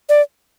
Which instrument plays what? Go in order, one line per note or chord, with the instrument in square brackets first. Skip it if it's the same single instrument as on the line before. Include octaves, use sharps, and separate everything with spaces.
[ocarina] D5